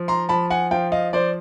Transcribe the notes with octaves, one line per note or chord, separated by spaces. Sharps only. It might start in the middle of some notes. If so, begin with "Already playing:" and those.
Already playing: F3
A#5 C6
F3 A5 B5
F#5 G#5
F3 F5 G5
D#5 F5
F3 C5 D5